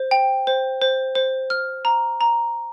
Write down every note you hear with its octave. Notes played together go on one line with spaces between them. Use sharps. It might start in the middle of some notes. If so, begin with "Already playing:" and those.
Already playing: C5
G5
C5
C5
C5
F6
A#5
A#5